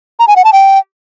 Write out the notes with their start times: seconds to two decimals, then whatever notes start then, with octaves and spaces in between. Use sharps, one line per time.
0.19 A#5
0.28 G#5
0.36 F#5
0.45 A5
0.53 G5